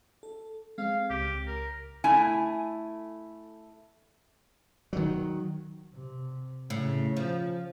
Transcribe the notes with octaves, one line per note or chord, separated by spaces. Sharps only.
A4
G#3 C4 F5
C#2 G4
A#4
A3 E4 G#5
D#3 F#3
C3
A2 C#3
F3